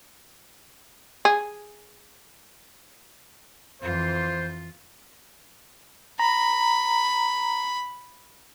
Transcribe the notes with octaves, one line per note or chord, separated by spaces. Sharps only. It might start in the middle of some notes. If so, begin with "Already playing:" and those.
G#4
F2 E3 F4 C5
A#5 B5